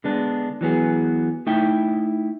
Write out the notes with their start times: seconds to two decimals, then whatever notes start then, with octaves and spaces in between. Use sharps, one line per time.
0.04 D3 G#3 B3 D4
0.61 E3 F#3 B3 G#4
1.46 A3 D#4 E4 E5 G5